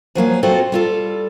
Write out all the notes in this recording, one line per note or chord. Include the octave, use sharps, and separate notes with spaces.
F3 F#3 A#3 G#5
C4 F4 F#4 A4 C5 D5
G3 F4 A4